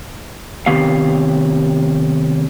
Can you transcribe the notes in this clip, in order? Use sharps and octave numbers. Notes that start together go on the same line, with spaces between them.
C3 D#3 B3 G4 F5